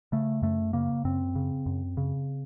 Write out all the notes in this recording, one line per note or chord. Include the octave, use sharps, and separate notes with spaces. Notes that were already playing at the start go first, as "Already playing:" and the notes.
C#3 A3
F#2 A3
C#3 A#3
F#2 C4
C#3
F#2
C#3